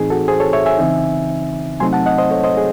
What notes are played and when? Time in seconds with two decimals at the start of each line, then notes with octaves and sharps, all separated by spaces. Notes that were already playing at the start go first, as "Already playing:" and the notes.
Already playing: A2 E3 C4 D#4 G#4
0.10 F#4 A4
0.28 G#4 C5
0.40 A4 C#5
0.53 C#5 E5
0.66 E5 G#5
0.78 C#3 E3 C4 D#4
1.80 C3 F#3 A3 C4 D#4 G#5 C6
1.93 F#5 A5
2.06 D#5 F#5
2.18 C5 D#5
2.31 A4 C#5
2.44 C5 D#5
2.57 G#4